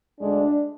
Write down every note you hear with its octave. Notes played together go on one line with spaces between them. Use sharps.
D2 D3 G#3 D4